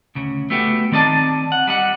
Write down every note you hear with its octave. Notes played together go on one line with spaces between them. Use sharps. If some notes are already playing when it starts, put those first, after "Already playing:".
D2 C#3
A3 B3 F#4 G4
D#3 C4 D5 D#5 A5
F#5
G3 D#5 F#5